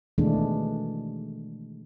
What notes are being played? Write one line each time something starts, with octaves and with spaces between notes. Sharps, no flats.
B2 D#3 E3 G#3 A3 D4